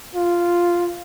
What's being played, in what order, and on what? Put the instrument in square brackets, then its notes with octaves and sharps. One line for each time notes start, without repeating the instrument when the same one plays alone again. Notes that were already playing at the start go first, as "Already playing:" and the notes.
[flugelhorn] F4